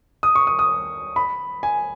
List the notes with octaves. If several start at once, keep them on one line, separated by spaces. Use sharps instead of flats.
D#6
C#6
D#6
D#6
B5
G#5